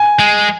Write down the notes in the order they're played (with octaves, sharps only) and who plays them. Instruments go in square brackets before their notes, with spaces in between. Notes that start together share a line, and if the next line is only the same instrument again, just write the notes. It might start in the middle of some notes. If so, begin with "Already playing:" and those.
Already playing: [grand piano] G#5
[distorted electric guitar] G#3